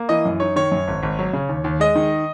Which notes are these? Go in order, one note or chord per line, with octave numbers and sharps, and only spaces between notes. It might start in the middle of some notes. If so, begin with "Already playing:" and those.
Already playing: A#3
E3 D#5
F#2
D#4 C#5
D#3 C#5
F#2
G#1
G#1
F#3
C#3
D#2
D#2
G#3 D#5
D#3